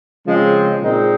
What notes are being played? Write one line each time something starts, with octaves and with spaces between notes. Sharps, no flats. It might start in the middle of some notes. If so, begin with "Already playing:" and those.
C#3 F3 G#3 C4
A#2 G#3 C4 D#4